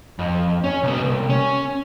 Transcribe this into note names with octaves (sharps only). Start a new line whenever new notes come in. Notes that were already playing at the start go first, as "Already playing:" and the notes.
F2
C#4
C2 B3
C2
C#4